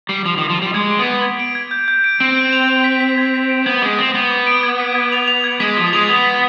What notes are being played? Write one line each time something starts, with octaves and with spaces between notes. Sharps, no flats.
G3 C7
F3 F7
D#3 D6
F3
G3 F7
G#3 G#6
D7
B3
B6
G#6
D7
G#6
G6
G6
D7
C4 D7
D7
F7
F7
B6
B6
G#6
B6
D7
B3 G#6
G#3 D6
C4 D6
B3 D6
D6
D7
G#6
B6
G#6
F7
F7
G#6
G#3 B6
F3 D#6
G#3 F7
B3 F7
B6